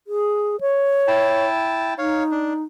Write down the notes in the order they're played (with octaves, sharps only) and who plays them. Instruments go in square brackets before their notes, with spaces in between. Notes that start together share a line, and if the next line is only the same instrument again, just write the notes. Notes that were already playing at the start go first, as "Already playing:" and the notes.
[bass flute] G#4
C#5
[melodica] E4 G5 A5
[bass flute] D#4 [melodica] C#5 F5
[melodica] D4